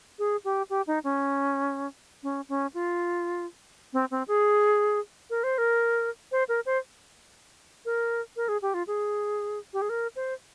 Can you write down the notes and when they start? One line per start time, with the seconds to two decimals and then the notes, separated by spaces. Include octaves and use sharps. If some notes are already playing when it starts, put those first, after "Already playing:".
0.19 G#4
0.45 G4
0.70 G4
0.87 D#4
1.04 C#4
2.23 C#4
2.49 C#4
2.74 F4
3.93 C4
4.11 C4
4.28 G#4
5.30 A#4
5.44 C5
5.58 A#4
6.32 C5
6.49 A#4
6.66 C5
7.85 A#4
8.36 A#4
8.48 G#4
8.62 G4
8.74 F4
8.87 G#4
9.73 G4
9.82 G#4
9.89 A#4
10.16 C5